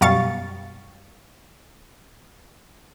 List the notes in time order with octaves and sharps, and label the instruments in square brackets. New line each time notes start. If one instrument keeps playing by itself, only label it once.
[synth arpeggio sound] F#2 B2 G3 F5 C#6 A6